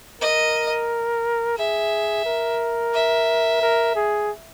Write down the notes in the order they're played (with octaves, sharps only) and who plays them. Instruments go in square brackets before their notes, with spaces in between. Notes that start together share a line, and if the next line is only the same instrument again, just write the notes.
[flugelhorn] A#4 [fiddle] D#5
[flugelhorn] G#4 [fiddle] E5
[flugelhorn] A#4
[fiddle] E5
[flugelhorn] A#4
G#4